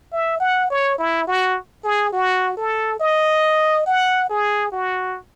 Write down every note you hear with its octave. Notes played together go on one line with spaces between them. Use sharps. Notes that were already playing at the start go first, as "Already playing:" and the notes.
E5
F#5
C#5
E4
F#4
G#4
F#4
A4
D#5
F#5
G#4
F#4